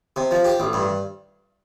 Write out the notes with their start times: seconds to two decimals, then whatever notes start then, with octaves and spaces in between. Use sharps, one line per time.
0.16 C3
0.31 F3
0.45 G4
0.60 A1
0.73 G2